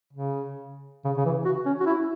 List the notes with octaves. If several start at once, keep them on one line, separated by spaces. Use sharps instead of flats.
C#3
C#3
C#3
E3
F#4
C#4
F#4
E4